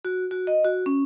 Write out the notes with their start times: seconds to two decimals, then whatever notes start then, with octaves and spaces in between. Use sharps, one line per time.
0.05 F#4
0.31 F#4
0.47 D#5
0.64 F#4
0.86 C#4